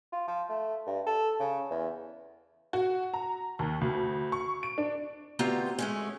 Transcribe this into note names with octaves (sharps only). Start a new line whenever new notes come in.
F4
F3
A3
G2
A4
C#3
E2
F#4
A#5
D#2
D2
C#6
D7
D4
D2 B3 C4 F4 G4 A#5
G#3 A3 C#4